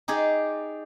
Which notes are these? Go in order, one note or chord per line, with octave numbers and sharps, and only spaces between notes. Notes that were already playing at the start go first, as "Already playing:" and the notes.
D#4 G4 G#4 D5